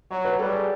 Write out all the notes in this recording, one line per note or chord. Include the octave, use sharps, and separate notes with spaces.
F#3 C#5
B4
G3 A4
G#4